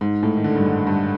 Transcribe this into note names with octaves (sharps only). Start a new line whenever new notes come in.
G#2
A2
D#3
D3
G2
G#2
G2